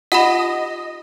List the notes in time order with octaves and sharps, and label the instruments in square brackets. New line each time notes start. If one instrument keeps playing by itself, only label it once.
[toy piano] D#4 F4 G4 [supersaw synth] D#5 [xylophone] F#5 B5